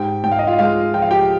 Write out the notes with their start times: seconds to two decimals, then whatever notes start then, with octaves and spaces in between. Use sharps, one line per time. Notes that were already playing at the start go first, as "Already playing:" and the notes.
Already playing: G#2 G4 G5
0.24 G#2 G5
0.31 F5
0.39 D#5
0.47 F4 F5
0.59 G#3 F4 F5
0.94 F3 G5
1.02 F5
1.11 G4 G5